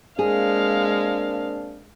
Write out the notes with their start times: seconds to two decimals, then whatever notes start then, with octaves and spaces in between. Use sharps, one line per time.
0.19 G#3 A#3 C4 D4 G#4 F5